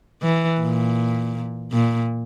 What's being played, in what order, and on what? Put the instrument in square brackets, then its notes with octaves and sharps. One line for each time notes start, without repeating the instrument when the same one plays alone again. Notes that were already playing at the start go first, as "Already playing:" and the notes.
[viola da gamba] E3
A#2
A#2